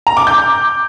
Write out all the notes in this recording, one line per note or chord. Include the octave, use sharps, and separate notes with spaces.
A#5
D6
G6